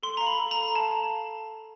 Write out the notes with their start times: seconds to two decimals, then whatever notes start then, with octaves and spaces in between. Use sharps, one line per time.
0.03 A4 C6
0.17 F5 A#5
0.27 B5
0.39 A4
0.51 A#5
0.57 A4
0.75 F5 A5